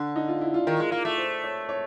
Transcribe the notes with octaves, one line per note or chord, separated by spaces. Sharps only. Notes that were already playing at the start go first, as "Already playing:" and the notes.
Already playing: D3
D#4
F4
E4
F4
D#3 A#4
G#3
A#3
A3
C5
C#5
C#5